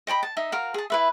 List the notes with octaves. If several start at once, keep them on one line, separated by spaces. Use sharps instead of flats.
D#5 G5 A5 B5
A5
D#4 D#5 E5
F#4 A#4 F5
G#4 A5
E4 B4 E5